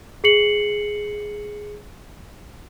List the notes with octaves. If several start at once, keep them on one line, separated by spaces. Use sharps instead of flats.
G#4 C7 C#7 F#7